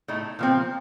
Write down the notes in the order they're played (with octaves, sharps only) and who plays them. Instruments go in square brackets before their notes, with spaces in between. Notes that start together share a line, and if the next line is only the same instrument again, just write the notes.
[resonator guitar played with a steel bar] A2 A3 D#4
A#2 F3 C4